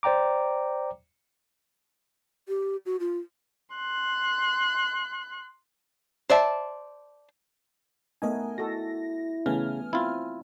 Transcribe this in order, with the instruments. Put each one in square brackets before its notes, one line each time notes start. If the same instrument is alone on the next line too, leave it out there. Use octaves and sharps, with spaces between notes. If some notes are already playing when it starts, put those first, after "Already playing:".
[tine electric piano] C5 D5 G5 A#5 D6
[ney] G4
F#4
F4
[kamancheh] C6 F#6
[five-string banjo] C5 D5 E5 A5
[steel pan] A3 B3 D#4 [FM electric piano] A#4 D#5 G#5
[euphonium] E4 [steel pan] F#4 A4 [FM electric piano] A#6
[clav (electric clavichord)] C#3 [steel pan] E3 A3 C#4 [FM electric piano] B3 G#5 F6
[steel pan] C4 [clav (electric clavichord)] E4 F4